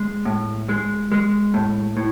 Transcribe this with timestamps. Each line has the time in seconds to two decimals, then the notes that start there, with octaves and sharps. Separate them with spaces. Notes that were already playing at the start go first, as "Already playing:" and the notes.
Already playing: G#3
0.25 A2
0.69 G#3
1.12 G#3
1.54 A2
1.97 A2